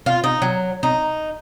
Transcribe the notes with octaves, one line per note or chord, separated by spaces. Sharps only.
F4
D#4
F#3
D#4